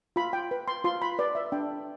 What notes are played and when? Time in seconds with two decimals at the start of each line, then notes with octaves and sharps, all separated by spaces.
0.16 F4 B5
0.33 G5
0.51 B4
0.68 C6
0.84 F4 C6
1.02 B5
1.19 B4 D5
1.35 E5
1.52 D4 G5